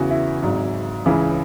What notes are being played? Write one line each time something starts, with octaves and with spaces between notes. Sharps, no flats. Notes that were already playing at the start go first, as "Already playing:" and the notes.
Already playing: E2 C#3 E3 F#4
E4
G#1 G#2 F#3
C#2 C#3 E3